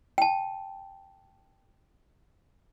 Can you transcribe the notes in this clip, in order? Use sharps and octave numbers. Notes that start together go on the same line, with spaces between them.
G5 A5